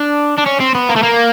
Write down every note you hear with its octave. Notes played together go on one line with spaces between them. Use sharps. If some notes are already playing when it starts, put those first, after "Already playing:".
Already playing: D4
D4
C#4
C4
B3
A#3
A3
A#3